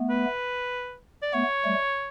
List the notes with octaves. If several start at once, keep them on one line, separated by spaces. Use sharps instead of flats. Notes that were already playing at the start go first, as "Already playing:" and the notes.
Already playing: A3 B3
B4
D5
A3 B3 C#5
G3 A3